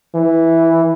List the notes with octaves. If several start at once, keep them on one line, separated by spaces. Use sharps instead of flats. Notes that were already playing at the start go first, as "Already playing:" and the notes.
E3